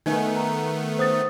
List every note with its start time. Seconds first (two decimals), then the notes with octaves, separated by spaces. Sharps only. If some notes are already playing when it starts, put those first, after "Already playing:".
0.06 D#3 A3 B3 D#4 D#5 G#5
0.36 A#5
0.99 C5 D#6 A6